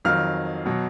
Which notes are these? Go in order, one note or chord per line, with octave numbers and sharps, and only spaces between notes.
F2 D#3 F#3 F5 F6
B2 F#3